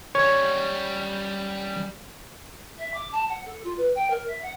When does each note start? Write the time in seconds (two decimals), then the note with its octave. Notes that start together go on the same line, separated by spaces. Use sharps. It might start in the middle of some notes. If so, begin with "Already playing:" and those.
0.15 G3 C#4 C#5
2.78 E5
2.93 D6
3.12 A5
3.29 F#5
3.45 A4
3.63 F4
3.77 B4
3.94 G5
4.10 A#4
4.27 E5
4.42 F#5